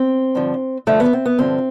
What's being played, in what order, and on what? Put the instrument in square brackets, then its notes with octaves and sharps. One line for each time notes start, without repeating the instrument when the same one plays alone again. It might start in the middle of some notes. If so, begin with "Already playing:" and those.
Already playing: [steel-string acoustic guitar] C4
G2 D3 F3
G2 D3 F3 A3
B3
C4
B3
G2 D3 F3 C4